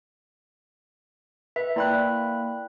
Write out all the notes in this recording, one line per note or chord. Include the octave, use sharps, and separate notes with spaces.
B4 E5 B6
A#3 E4 D5 G5 B5 F#6